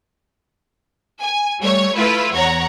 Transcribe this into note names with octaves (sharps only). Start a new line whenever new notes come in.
G#5
G3 A3 C#5
A3 E4 F4 B4
E2 C#5 F#5 A#5